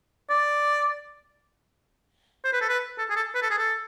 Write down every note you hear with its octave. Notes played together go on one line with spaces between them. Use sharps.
D5
C5
B4
A4
B4
A4
G#4
A4
B4
A4
G#4
A4